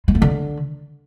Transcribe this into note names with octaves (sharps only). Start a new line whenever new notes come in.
G#3
A3
D3